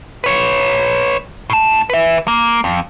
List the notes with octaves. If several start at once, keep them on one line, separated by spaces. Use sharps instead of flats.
B4 C#5
A2 A5
B4 E5
A#3
F2